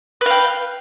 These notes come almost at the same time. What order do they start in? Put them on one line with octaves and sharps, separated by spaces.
B4 F5 G5